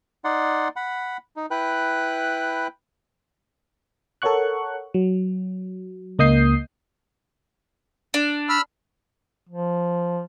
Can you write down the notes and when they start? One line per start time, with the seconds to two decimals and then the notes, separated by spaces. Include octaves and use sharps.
0.24 D#4 D5 F#5 C6
0.76 F#5 B5
1.36 D#4
1.51 E4 B4 G5 F#6
4.22 A4 A#4 C#5 F#5 C#6 F#6
4.94 F#3
6.19 C#2 A#3 D#5 D#6 G6 C7
8.14 D4
8.49 B5 E6 F6
9.49 F3